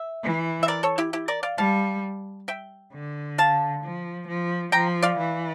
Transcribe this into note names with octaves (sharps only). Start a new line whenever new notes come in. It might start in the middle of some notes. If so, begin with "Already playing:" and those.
Already playing: E5
E3
E5
A#4 D5
A4 C#5
E4 G4
E4 G4
A#4 D5
D5 F5
G3 F5 A5
E5 G5
D3
F5 A5
F3
F3
F3 G5 A#5
D5 F5
E3